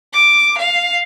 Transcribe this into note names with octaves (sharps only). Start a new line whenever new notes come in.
D6
F5